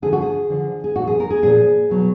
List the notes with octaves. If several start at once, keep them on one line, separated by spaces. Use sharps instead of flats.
D3 F3 G#4
F#4
G#4
D3 F3
G#4
A#2 F3 F#4
G#4
A#4
G#4
A#2 F3 G#4
B2 F#3